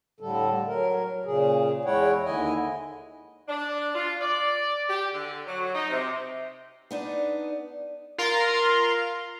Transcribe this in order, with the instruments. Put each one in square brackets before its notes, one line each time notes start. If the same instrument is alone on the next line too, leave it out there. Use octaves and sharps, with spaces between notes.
[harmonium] A2 D3 G3 A4
F#3 A#4
A#2 C#3 G#4
E2 G#3 E4 C#5 F#5 G5
D#2 D3 E4 D#5 G#5
[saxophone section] D4
F4
D5
G4
D3
F#3
D#4
C3
[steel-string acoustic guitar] B3 D4 D#4
[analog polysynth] F4 A#4 F5 A#5 C6